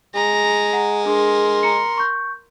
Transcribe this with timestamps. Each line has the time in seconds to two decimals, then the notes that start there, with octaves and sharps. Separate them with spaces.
0.15 G#3 A#5
0.73 F#5 A#5
1.05 D4 G#4 A#4 C6
1.63 A#5 C#7
1.98 C#6 G6